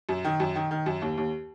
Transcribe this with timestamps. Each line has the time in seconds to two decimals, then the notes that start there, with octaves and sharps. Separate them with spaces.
0.09 F#2
0.25 D#3
0.40 F#2
0.55 D#3
0.71 D#3
0.86 F#2
1.02 D#2
1.18 D#2